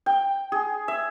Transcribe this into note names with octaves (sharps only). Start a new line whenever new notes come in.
G5
G#4
E5